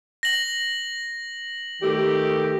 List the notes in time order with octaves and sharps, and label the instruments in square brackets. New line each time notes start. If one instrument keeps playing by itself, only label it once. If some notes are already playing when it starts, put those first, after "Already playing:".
[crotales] A#6 F#7
[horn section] D#3 A3 G4